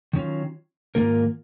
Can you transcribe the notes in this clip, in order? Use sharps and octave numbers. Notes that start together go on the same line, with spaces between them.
D#3 F#3 C#4 F4
G#2 D#3 A#3 F4 A#4